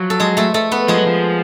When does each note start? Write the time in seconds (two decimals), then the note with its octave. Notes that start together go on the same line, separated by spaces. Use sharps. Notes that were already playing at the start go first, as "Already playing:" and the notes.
Already playing: F3 F#3
0.10 A4
0.20 G#3 G#4
0.37 A3 A4
0.54 A3 A4
0.72 B3 B4
0.88 F3 G#3 G#4
0.98 F#3
1.06 F3